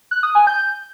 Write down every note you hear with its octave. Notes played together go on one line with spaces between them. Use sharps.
F#6
D#6
G#5
G6